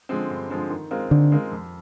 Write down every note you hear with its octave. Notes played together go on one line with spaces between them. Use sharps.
D3 F3 G#3 C4
G2
D3 F3 G#3 C4
D#3
G#3 C4 F4 A#4
D3 D#3
G#3 C4 F4 A#4
F2